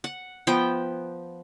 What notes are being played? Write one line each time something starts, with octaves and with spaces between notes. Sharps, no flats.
F#5
F3 B3 G5